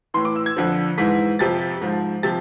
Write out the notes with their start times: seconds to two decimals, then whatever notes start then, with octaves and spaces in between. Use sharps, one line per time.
0.14 A2 E3 C6
0.25 D6
0.36 E6
0.46 G#6
0.57 F2 D3 F3
0.98 G#2 E3 B6
1.39 F2 C3 F3 A6
1.81 G#2 F3
2.23 C3 F3 A6